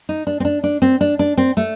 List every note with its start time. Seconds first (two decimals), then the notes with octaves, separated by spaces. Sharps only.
0.09 D#4
0.27 D4
0.40 C4
0.45 D4
0.64 D4
0.82 C4
1.01 D4
1.19 D4
1.37 C4
1.57 A3